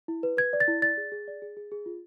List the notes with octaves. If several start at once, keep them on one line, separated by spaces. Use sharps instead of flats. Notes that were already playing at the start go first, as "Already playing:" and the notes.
E4
B4
B4 G#6
D5
A6
E4
D5 A6
G#4
G#4
D5
G#4
G#4
G#4
F4